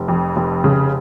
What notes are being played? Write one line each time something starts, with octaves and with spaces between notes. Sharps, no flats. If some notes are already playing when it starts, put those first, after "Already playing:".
Already playing: F1
F2
F1
C#3